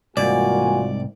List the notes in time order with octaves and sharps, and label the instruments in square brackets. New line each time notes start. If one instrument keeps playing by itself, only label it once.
[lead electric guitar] C2 G#2 [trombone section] E3 F4 F#4 [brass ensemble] A#3 G#5 [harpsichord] D5